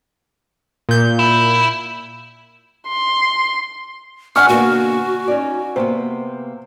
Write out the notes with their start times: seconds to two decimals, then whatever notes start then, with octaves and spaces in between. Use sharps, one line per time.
0.89 A#2 G6
1.19 E4
2.88 C6
4.36 D4 F#5 G#5 C#6 F6
4.48 B2 D3 A#3 F#4
5.28 C#4 D#4 D5
5.76 C3 A#3 B3 C5